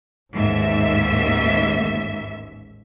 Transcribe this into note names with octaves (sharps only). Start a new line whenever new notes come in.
A1 D#2 G#2 E5